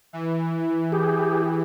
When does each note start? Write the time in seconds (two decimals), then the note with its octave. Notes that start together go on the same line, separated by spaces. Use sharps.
0.13 E3
0.92 G4 G#4